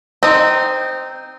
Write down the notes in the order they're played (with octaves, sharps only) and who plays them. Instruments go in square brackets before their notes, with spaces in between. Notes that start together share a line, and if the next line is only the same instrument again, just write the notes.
[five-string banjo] C4 D#4